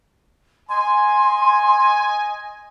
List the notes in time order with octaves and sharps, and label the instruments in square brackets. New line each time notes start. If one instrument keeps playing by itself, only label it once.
[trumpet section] D#5 G#5 [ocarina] C6